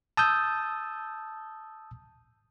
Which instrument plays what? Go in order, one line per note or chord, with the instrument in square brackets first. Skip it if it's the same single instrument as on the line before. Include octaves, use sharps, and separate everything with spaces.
[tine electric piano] A5 D#6 E6 G6